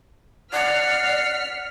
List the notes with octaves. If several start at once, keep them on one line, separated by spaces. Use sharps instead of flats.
D5 F#5 F6 B6 C7